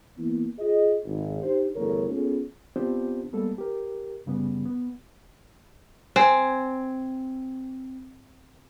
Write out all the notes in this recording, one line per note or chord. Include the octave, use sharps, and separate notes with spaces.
E3 A#3 B3
F4 G#4 D#5
G#1
D4 D#4 G4 C5
E2 G2 D3 A3 A#4 C#5
B3 C#4 F4 G#4 A4
B3 C4 D4 F4 G4 C5
G3 G#3 A#3 B3 A4
G4 A#4
F#2 C#3 G3 B3
B3
C4 G#5